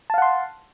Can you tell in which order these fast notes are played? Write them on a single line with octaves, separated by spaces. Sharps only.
A5 F5 F#5 C6